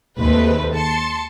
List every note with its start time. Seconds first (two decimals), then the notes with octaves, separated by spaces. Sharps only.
0.19 D#2 G#3 A3 C4 B4
0.75 A5 C6 C#7